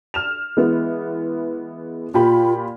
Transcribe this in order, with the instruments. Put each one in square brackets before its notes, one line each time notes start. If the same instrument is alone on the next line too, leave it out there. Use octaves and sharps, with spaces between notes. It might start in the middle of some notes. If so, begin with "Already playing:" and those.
[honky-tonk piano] F6 E7 F7
E3 G#3 B3
[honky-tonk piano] A#2 G4 B5 [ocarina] F4